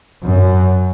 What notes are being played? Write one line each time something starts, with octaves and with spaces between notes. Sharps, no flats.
F#2